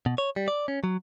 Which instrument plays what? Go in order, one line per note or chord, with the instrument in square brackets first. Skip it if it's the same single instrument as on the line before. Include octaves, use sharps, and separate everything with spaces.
[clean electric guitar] B2
C#5
G3
D5
C#4
F#3